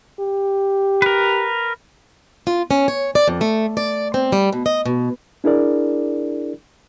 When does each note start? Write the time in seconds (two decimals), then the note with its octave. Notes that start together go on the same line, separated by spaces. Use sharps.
0.20 G4
1.02 A#4 B4
2.47 F4
2.71 C#4
2.88 C#5
3.15 D5
3.28 F2
3.41 A3
3.77 D5
4.14 C4
4.32 G3
4.53 B2
4.66 D#5
4.86 B2
5.44 D4 E4 G#4 A#4 D5